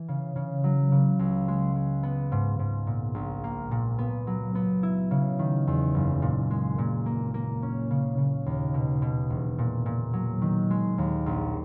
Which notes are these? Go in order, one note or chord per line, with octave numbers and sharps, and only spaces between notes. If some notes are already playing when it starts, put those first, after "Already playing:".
Already playing: E3
C#3
C#3
F#3
C#3
C#2
G#3
G#3
B3
G#2
G#2
A#2
A#1
A#3
A#2
B3
F#3
B3
E4
C#3
D#3
E2
F#1
A#2
G#3
A#2
A#3
A#3
C#4
C#3
C#3
D#2
B2
B2
E1
A#2
A#2
F#3
D#3
G#3
D#2
A#1